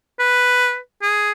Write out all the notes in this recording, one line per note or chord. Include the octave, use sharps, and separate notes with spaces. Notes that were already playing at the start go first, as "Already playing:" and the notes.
B4
G#4